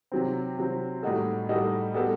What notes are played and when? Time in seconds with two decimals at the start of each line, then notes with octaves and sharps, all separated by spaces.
0.12 C3 F#3 C4
0.58 C3 F#3 C4
1.03 A2 G3 D#4 F#4 A4
1.49 A2 G3 D#4 F#4 A4
1.94 G3 B3 F#4 A4